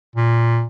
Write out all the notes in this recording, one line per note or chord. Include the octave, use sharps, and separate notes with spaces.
A#2